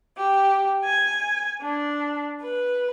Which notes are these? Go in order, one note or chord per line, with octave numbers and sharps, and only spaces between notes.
G4
G#5
D4
B4